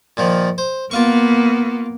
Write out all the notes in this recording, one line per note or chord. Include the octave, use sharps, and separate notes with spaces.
A#2 D#3 F3
C5
A#3 B3 F4 F5 C#6